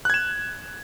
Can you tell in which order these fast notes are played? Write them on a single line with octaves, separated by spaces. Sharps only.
F#6 G#6 E7